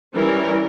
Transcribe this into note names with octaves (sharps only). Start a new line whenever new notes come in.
E3 G3 C#4 A#4